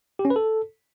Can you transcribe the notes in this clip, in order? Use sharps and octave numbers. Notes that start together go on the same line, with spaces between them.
G4
C#4
B4
A4